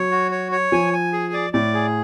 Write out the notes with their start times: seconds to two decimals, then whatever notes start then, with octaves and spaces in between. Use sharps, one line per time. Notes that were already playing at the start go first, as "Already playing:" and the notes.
Already playing: F#3 C#5
0.11 F#4
0.32 C#5
0.52 C#5
0.72 F3 G#5
0.93 G#5
1.13 G#4
1.34 D5
1.53 A2 D5
1.74 G#4